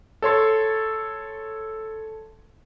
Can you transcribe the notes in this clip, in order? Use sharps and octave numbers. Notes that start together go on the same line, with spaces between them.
A4 C#5 C6 A6